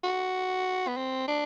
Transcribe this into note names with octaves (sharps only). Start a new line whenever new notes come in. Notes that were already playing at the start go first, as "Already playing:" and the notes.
F#4
B3
C4
D4